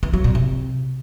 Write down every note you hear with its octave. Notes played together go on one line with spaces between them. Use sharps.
E3
F#3
A#2
C3